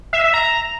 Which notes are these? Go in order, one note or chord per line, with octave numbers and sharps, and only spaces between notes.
E5
E5
A#5